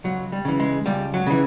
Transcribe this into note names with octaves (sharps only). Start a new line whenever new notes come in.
C#2 F#3
G3
C#3 E3
G#3
C#2 G3
F#3
C#3 E3